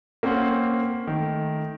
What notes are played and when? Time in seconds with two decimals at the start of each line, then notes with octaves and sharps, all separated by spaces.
0.23 A#3 C4 C#4 C5 F#5
1.07 D#3 A3